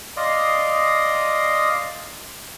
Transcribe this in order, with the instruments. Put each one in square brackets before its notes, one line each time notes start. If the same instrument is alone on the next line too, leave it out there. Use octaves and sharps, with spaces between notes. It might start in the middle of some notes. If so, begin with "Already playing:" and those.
[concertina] D5 D#5 F5 C6 D#6